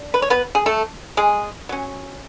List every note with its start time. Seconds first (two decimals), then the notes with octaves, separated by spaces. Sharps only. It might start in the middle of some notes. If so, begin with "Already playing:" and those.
Already playing: D4
0.14 B4
0.22 C#5
0.30 B3 B4
0.55 G#4
0.66 A3 A4
1.17 G#3 G#4
1.69 F#3 C#4